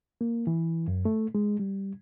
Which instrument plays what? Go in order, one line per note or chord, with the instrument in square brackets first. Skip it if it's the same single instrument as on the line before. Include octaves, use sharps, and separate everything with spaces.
[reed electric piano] A#3
E3
F#2
A3
G#3
G3